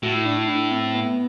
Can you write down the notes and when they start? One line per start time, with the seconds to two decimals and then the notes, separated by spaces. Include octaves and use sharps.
0.03 A2 F#4
0.14 E4
0.25 D4
0.38 E4
0.48 D4
0.71 C4
0.94 B3